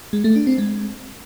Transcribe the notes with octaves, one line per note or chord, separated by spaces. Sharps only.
G#3
A3
D4
C4
G#3